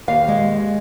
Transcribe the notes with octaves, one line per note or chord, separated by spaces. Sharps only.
D#2 F5
G#3